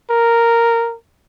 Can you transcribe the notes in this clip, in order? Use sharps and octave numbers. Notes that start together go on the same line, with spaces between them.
A#4